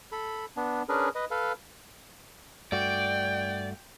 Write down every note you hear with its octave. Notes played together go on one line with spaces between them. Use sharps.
A4 B5
B3 D4
C#4 D4 G#4 A#4 B4
B4 D#5
A4 B4 F5
G2 A3 F#4 D5 G5